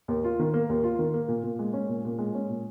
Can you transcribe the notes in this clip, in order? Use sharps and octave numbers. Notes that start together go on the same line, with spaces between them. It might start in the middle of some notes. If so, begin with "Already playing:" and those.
D#2
F4
D#3
A#3
D#2
F4
D#3
A#3
A#2
A#2
G#3
C#4
A#2
A#2
G#3
C#4
A#2